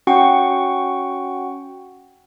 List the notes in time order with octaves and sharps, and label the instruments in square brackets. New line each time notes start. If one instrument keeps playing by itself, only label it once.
[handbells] C#4 F#4 F#5 G5 C#6